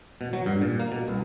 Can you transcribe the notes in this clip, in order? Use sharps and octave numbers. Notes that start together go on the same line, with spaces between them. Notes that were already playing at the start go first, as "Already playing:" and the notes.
B2
F#3
G2
A#2
A#3
B2
C2